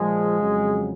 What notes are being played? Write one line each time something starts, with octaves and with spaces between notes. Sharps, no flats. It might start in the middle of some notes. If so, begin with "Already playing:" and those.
Already playing: A#2 F3 G#3
F2 C#3 F#3